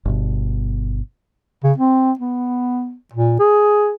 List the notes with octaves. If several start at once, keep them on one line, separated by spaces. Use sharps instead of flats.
G1 B2
C#3
C4
B3
A#2
G#4